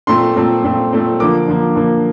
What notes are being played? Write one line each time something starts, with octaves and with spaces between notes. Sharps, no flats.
A#2 A3 C4 C6
A#2 A3 C4
A#2 A3 C4
A#2 A3 C4
D3 F3 A#3 D6
D3 F3 A#3
D3 F3 A#3